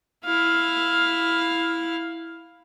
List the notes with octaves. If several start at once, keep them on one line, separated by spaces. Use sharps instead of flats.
E4 F5